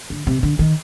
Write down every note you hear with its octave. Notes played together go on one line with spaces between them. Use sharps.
D3
C3
D3
D#3